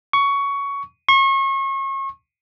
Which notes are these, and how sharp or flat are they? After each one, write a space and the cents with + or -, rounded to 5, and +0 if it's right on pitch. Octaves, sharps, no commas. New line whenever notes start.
C#6 +15
C#6 -35